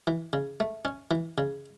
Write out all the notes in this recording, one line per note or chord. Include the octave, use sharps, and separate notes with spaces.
E3
C#3
A3
C#4
E3
C#3